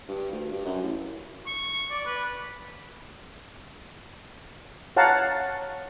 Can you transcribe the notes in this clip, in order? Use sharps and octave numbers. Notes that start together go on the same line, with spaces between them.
G2
D2
G2
F#2
A1
C#6
D5
B4
C#5 F5 F#5 A5 A#5